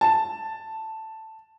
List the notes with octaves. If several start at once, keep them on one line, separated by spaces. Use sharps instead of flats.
A5